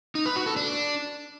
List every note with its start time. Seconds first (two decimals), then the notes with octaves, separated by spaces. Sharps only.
0.15 D#4
0.26 B4
0.36 F#4
0.46 A4
0.57 D4